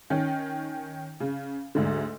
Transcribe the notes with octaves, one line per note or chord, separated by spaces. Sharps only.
D#3 C#4
C#3
D2 G#2 D3